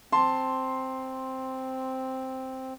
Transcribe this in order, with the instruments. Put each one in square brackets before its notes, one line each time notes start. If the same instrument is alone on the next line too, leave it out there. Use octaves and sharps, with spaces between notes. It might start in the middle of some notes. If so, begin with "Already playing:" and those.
[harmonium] C4 [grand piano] A5 C6